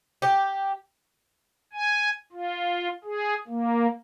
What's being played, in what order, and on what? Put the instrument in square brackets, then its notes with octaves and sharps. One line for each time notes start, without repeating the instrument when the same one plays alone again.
[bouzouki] G4
[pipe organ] G#5
F4
G#4
A#3